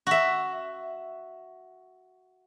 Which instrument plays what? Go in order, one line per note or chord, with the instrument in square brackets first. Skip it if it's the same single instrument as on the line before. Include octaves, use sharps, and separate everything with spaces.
[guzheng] F#4 E5